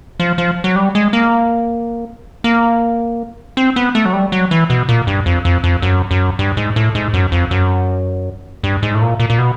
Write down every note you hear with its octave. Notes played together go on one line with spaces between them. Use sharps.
F3
F3
F#3
G3
G#3
A#3
A#3
C4
B3
A3
F#3
G3
F#3
E3
B2
A#2
G2
F2
F2
F2
F#2
F#2
G2
G#2
A2
G#2
F#2
F2
F#2
G2
G#2
A2
A#2
A#2
A#2
B2